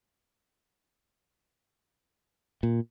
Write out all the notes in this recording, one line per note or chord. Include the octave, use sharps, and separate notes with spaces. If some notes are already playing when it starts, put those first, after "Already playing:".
A#2